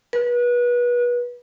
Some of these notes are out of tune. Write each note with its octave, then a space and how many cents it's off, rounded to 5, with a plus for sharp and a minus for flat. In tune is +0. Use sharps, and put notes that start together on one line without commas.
B4 -30